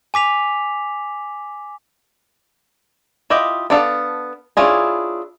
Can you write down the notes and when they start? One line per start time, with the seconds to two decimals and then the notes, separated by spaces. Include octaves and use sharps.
0.14 G#5 D6 B6 F7
3.30 E4 F4 G4 D#5
3.70 B3 D4 A4 F5
4.57 C#4 D4 E4 F4 G#4